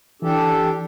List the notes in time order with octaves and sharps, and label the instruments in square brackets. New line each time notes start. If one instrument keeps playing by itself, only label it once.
[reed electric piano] E3 [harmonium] D4 G4 A4